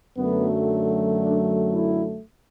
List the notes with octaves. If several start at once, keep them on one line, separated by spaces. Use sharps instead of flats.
F#2 D3 F#3 A3 B3
D4
E4